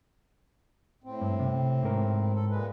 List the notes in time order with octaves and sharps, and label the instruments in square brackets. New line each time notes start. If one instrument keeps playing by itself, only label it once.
[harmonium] A2 C4
[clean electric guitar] G2
C3
G#2 A#4
[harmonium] A4
A#2 G#3 B4